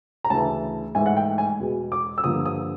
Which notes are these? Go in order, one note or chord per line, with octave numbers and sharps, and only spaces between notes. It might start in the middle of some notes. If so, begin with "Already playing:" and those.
A#5
D2 C#3 E3 A5
G#2 E3 A3 G#5
F#5
G5
G#5
E2 B2 G#3
D6
E6
G2 D3 F3 A#3 D#6
D#6